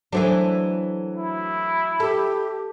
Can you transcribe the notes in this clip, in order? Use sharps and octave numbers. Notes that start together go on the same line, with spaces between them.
E3 F#3 A3 D4 F#4 C5
E4
G4 A4